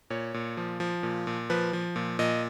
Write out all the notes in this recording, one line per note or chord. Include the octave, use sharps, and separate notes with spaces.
A#2 C#5
A#2
F3
F3
A#2
A#2
F3 B4
F3
A#2
A#2 D#5